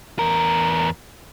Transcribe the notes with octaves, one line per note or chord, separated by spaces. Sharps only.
E2 A#4